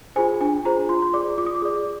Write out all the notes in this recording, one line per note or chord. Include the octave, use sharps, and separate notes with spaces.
F4 G#4 C5 G#5
D4 G#5
F4 G#4 C5 A#5
F4 C6
C6
G#4 D5 D6
F4 D6
D#6
D6
G#4 D5